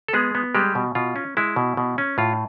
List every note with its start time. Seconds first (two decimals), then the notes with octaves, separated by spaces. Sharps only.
0.08 A4
0.13 G#3 B3 G#4
0.35 B3
0.55 G3 G#3 G4
0.75 B2
0.95 B2 F4
1.16 C#4
1.37 G#3 E4
1.56 B2
1.77 B2
1.98 C#4
2.18 A2 F4